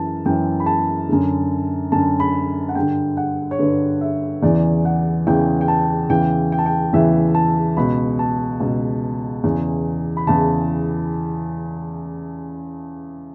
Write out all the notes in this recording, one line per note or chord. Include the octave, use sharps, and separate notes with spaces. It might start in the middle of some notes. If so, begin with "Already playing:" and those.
Already playing: F#2 E3 A5
F#2 E3 G5
B5
A5
F#2 D3
F#2 D3 A5
B5
F#5
G2 D3 G5
F#5
C#5
G2 D3 B4
E5
E2 C#3 E3 D5
F#5
E2 C#3 E3 G5
G5
A5
E2 C#3 E3 G5
G5
A5
G5
E2 C#3 E3 E5
A5
C#2 B2 B5
A5
C#2 B2
E2 C#3 E3
B5
E2 C#3 E3 A5